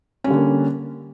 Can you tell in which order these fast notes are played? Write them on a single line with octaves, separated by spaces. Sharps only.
C#4 G3 D3 A#3